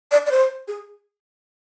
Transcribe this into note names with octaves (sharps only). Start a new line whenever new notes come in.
D5
D5
C5
G#4